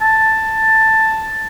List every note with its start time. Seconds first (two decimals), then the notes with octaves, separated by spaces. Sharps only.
0.01 A5